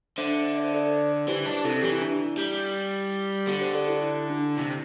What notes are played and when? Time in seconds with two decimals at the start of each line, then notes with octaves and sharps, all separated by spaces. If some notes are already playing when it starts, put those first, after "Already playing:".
0.18 D3 C5 E5
0.46 E5
0.55 D5
0.64 C5
0.74 A4 D5
1.28 E3 G4 C5
1.46 D4
1.65 C3 E4 A4
1.82 E3 G4
1.92 E4
2.02 D4
2.11 E4
2.38 G3
3.47 D3 G4
3.60 G4 C5
3.75 A4 D5
3.88 E4 A4
4.02 E4
4.30 D4
4.57 C3 E4